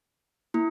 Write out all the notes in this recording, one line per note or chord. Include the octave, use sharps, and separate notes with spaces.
A#3 E4